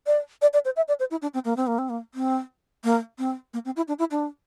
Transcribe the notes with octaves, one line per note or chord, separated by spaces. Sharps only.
D5
D5
D5
C5
E5
D5
C5
E4
D4
C4
A#3
C4
A#3
C4
A#3
C4
A#3
C4
A#3
C4
E4
D4
E4
D4